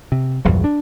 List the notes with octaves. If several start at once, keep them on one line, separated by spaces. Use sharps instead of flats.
C3
A#1 E2 G2 F#3
D4